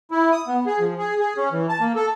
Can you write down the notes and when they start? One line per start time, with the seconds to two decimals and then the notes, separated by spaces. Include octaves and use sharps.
0.11 E4
0.32 D#6
0.47 B3
0.66 G#4
0.79 F3
0.98 G#4
1.20 G#4
1.37 C#4
1.52 E3
1.69 A5
1.81 A#3
1.95 A4